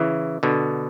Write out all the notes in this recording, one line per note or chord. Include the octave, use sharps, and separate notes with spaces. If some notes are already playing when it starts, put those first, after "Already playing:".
Already playing: C#3 E3
B2 D3